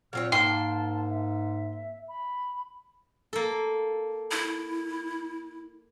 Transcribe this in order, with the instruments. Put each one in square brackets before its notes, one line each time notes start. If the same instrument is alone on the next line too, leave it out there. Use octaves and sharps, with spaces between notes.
[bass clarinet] A#2 [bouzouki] F#3 C4 C#5 [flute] F6
[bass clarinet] G#2 [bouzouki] A#3 G5 [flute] A5 [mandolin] C6
[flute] E5
B5
[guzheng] A#3 A4
[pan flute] E4